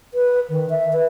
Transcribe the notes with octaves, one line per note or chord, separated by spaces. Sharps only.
B4
D#3
E5
B4